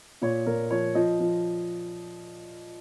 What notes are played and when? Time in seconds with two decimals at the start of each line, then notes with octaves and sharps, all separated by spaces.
0.22 A#2 C#5
0.46 A#2 A#4
0.71 F3 C#5
0.95 F3 D#5
1.20 F3